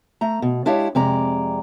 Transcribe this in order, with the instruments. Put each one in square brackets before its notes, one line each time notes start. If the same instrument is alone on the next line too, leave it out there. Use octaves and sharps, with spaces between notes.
[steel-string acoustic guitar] A3 A#5
B2
G#3 D4 E4 G4 C#5 F5
F2 C3 G#3 D5 A#5